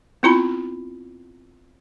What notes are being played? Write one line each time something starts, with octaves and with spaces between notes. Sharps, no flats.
B3 C4 E4 F4 A#5 B5